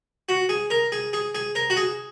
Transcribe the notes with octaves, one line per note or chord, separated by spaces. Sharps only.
F#4
G#4
A#4
G#4
G#4
G#4
A#4
F#4
G#4